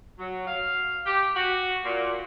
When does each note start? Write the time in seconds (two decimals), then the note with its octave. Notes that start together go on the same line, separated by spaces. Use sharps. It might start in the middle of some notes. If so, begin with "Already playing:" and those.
0.19 F#3
0.47 F5
1.06 G4
1.36 F#4
1.85 A#2